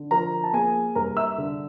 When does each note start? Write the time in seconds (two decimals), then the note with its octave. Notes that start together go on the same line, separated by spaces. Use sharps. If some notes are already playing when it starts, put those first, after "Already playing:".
Already playing: D3
0.11 F3 A#4 A#5
0.44 A5
0.53 A#3 G#4 G#5
0.95 G2 A#4 A#5
1.17 E5 E6
1.38 D3